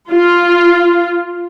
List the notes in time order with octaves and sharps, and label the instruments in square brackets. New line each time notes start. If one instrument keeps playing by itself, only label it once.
[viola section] F4